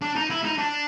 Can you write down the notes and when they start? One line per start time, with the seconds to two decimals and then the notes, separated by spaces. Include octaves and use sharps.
0.01 D4
0.16 D#4
0.30 E4
0.44 D#4
0.58 D4